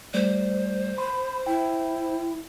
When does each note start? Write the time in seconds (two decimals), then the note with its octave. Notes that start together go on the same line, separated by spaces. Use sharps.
0.14 G3 A3 C5 D5
0.98 B5 C6
1.47 E4 G5